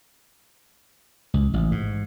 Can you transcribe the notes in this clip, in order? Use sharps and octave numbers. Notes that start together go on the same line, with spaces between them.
C#2
A1
G#2